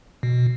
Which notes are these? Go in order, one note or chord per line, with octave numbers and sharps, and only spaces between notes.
B2